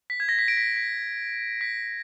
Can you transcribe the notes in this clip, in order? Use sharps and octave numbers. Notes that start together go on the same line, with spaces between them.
B6
G#6
A#6
B6
D7
B6
B6
B6